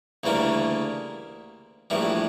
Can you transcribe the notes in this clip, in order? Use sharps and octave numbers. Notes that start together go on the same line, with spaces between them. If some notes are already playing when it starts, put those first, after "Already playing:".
D2 C#3 E3 G3 A#3
A#1 A2 E3 G3